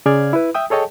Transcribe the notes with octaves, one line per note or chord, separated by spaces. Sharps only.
C#3 G#4 D5 F6 G#6
E4 B4
E5 G5 D#6
G#4 A4 C#5 D#5 G5 A5